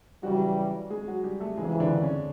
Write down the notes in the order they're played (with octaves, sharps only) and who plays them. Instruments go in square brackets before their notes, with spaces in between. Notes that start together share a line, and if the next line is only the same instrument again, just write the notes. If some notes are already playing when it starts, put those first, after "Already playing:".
[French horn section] C#3 E3 G3 [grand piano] F#3 F#4
[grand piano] G#3 G#4
F#3 F#4
G3 G4
A3 A4
[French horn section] F2 C#3 E3 [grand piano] G#3 G#4
[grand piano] D3 D4
C#4